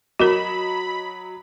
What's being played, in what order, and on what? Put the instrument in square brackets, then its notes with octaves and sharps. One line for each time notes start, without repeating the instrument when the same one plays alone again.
[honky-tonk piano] F#3 D#5 E7 [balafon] F#4 A#4 [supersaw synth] B5